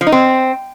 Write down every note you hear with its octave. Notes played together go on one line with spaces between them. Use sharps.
F3
D#4
C4